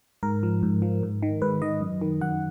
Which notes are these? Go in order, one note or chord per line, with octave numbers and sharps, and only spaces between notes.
G#2 A#4
F3
G#2
F3
G#2
D#3
G#2 B4
D#3 D#5
F#2
D#3
F#2 F#5